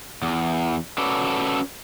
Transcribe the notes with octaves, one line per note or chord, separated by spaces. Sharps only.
E2
C#4 F#4 A4 B4 D5